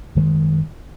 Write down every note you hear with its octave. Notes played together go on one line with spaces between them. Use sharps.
F#2 D#3 G#3